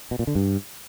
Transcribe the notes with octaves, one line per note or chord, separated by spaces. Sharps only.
B2
A#2
D3
G2